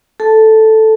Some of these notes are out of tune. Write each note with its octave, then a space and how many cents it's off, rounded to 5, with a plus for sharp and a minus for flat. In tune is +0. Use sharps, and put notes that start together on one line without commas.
A4 +0 A5 +0